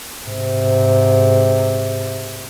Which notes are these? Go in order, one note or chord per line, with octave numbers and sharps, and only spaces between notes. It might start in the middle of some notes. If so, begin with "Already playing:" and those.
G#2 C3